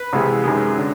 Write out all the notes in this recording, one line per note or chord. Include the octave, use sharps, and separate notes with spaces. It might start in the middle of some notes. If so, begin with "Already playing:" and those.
Already playing: B4
C2 C3 E3 G#3
F#2 D#3 G#3
D3